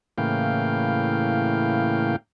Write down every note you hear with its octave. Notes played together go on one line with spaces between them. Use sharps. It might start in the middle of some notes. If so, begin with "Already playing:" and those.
A2 C#3 E3 A#3 F5 G5